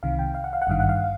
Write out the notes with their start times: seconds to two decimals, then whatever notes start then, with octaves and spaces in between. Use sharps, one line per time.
0.03 C2 C3 D#3 F5
0.19 G5
0.34 F5
0.44 F#5
0.53 F5
0.62 F#5
0.67 G#1 G2 D#3 F5
0.80 F#5
0.89 F5